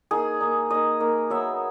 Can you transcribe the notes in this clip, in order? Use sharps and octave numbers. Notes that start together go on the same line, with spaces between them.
A#3 D#4 G#4
A#3 D#4
A#3 D#4 D#5
A#3 D#4
F#3 B3 D#4 E5